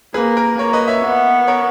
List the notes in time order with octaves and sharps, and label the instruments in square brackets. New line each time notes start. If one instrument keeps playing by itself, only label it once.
[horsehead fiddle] A#3 [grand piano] G#4 B4
[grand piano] A#4
[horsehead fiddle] A#3 [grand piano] A#4 C#5
[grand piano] B4 D#5
C#5 E5
[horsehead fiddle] B3
[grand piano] A#4 C#5